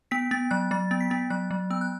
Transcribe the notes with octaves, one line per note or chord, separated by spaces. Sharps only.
B3 B6
B3 A6
F#3 F#6
F#3 A6
B3 A6
B6
B3 A6
F#3 F#6
F#3
B3 E6
F#6